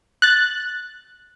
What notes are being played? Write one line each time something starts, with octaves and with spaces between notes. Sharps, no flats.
F#6 A6